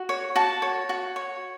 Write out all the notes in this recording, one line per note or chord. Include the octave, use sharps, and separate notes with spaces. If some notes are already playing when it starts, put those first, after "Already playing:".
Already playing: F#4
C#5
F#4 A5
C#5
F#4
C#5